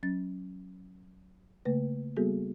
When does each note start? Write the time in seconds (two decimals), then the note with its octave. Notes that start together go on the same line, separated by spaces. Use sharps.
0.03 F#3 C#4 A6
1.65 C#3 A3 A#3 B4
2.16 G3 A#3 B3 F#4 G#4 A4